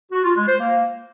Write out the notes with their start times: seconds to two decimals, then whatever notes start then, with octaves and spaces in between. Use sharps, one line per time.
0.12 F#4
0.24 F4
0.36 G#3
0.48 C5
0.60 A#3